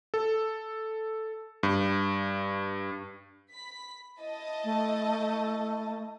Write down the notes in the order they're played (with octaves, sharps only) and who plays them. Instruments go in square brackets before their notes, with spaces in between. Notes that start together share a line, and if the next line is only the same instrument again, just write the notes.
[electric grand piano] A4
G2
[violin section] B5 B6
E4 D#5 A5
[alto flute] A3